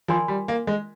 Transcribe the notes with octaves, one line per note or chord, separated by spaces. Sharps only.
F3 F4 A#4 D5 G#5 C6
G3
A#3
G#3